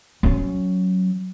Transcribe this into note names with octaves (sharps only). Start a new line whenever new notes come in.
F#3 C#4